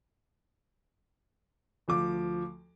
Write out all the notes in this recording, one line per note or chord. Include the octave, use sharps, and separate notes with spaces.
D2 F3 D6